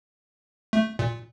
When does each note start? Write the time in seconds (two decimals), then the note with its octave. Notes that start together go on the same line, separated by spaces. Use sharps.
0.73 A3
0.99 A#2